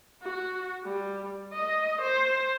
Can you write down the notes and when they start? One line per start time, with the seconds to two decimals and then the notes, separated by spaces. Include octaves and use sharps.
0.22 F#4
0.84 G3
1.53 D#5
2.02 C5